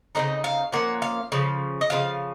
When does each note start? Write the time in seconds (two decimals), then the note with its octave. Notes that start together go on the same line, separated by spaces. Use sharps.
0.15 C#3 G#3 C4 D#4 D#5
0.44 F5
0.72 F3 A#3 C#4 F#5
1.02 F5
1.32 C#3 F3
1.81 D#5
1.90 C#3 F3 F5